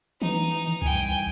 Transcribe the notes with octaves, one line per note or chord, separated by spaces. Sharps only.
E3 D#4
C2 G5 G#5